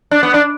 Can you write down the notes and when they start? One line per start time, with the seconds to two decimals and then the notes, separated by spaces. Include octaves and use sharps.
0.11 D4
0.23 B3
0.34 D4